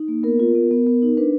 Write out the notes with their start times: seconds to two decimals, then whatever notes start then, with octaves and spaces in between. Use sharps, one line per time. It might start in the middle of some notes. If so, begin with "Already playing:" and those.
Already playing: D#4
0.08 A#3
0.23 B3 A#4
0.39 F4
0.55 B3
0.71 B3
0.87 B3
1.02 D#4
1.17 D4 B4